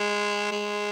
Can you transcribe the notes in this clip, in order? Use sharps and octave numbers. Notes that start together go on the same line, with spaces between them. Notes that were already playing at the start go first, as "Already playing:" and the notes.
Already playing: G#3
G#3